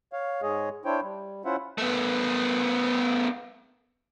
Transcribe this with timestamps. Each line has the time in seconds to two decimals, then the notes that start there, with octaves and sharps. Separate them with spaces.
0.13 C#5 F5
0.42 G#2 G#3 G#4 C#5 D#5
0.85 D4 E4 C5 C#5 G5
1.03 G3
1.45 C#4 E4 F4 C5 E5 F#5
1.78 A3 B3